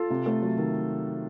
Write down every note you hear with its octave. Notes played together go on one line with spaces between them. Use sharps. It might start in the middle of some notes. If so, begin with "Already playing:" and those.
Already playing: F4 A4
C3
A3
F#3
D#3